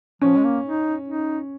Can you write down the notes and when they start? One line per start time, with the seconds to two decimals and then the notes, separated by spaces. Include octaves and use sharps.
0.22 F3 C#4
0.37 G#3
0.44 A#3
0.65 D#4
1.08 D#4